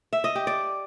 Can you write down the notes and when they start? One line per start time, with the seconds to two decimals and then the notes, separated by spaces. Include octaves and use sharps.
0.13 E5
0.24 D#5
0.35 G4
0.47 D5